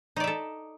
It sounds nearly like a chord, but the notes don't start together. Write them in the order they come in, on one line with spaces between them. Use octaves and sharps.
D#4 D5 E5 A4